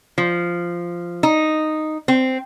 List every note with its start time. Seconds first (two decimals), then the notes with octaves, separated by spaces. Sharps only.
0.18 F3
1.23 D#4
2.08 C4